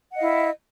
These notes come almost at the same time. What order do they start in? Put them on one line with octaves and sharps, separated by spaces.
F#5 D#5 F5 E4